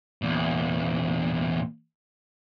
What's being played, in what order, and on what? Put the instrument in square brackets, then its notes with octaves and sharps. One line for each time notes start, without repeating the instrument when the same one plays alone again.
[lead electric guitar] E2 A#2